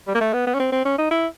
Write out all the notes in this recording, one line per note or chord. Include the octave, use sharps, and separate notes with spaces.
G3
A#3
A3
B3
B3
C#4
C4
C4
C#4
D#4
E4